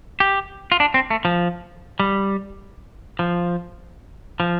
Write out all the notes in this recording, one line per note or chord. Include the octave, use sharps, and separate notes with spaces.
G4
F4
D4
C4
A3
F3
G3
F3
F3